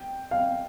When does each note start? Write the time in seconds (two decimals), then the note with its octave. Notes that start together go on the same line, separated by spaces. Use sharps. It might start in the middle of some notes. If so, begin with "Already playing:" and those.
Already playing: G5
0.31 F5